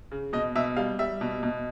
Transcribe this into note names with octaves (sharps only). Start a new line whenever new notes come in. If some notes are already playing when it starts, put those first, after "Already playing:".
C#3
B2 D#5
B2 E5
G3 F5
G3 E5
B2
B2